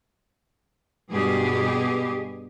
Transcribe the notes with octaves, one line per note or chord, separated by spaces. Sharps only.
G2 B2 G4 G#4